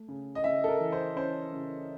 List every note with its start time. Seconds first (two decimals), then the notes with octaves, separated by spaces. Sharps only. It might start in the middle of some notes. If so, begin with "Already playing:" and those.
Already playing: A3
0.08 C#3
0.35 D#5
0.44 C#3 E5
0.64 A4
0.68 A#4
0.80 E3
0.92 C5
1.16 C#4 C5
1.52 C#3